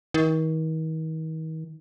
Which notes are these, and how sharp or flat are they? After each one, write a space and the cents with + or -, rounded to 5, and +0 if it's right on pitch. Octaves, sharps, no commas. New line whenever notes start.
D#3 +40